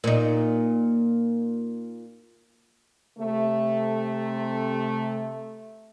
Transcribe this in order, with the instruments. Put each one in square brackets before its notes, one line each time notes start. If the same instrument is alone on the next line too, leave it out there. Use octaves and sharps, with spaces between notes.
[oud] A#2 D#4
[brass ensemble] C3 A3